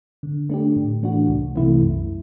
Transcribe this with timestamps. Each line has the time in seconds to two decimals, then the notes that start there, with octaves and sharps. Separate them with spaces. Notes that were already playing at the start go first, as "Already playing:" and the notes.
0.23 D3
0.50 A3 D4 G4
0.76 A2
1.03 E3 A3 D4 F#4
1.28 C2
1.55 C3 E3 A3 E4
1.82 F#2